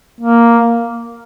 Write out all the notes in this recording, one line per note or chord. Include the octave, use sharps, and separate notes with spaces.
A#3